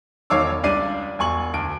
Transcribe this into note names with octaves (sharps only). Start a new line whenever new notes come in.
E1 D#3 C#5 F5 D6 E6
C#2 G3 D4 D5 C7 D#7
E1 G#5 C#6 F#7
D2 D7